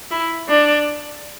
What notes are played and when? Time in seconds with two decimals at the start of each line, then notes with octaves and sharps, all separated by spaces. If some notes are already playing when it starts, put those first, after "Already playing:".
0.11 E4
0.49 D4